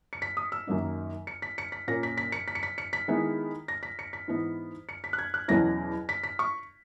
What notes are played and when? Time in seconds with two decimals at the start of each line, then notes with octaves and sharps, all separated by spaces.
0.13 C#7
0.22 B6
0.37 D#6
0.52 E6
0.67 F#2 D#3 F#3 A#3 D#4
1.27 C#7
1.42 B6
1.58 C#7
1.72 B6
1.88 A#2 A#3 C#4 A#6
2.03 B6
2.17 B6
2.32 C#7
2.48 B6
2.55 C#7
2.63 B6
2.78 C#7
2.93 B6
3.08 D#3 G#3 B3 E4
3.68 A#6
3.83 B6
3.99 C#7
4.13 B6
4.28 G#2 E3 B3 E4
4.89 C#7
5.04 B6
5.13 F#6
5.18 G#6
5.34 F#6
5.48 E2 B2 F#3 C#4 E4 A#6
6.09 B6
6.23 B6
6.39 C#6